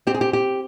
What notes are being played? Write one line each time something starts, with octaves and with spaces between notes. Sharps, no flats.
C4 G4
G#4
G4
G4